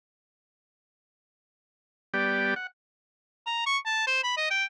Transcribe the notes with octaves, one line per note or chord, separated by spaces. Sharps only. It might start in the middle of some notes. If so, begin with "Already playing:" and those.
G3 B3 G4 D5 G5
F#5
A#5
C#6
A5
C5
B5
D#5
G5